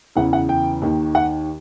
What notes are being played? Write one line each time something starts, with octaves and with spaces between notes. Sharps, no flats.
E2 C#3 E3 F#5
F#5
G5
D#2 D#3
F#5